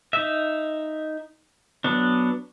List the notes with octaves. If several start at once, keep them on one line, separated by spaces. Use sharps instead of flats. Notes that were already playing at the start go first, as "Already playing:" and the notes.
D#4 E5
F#3 B3 D4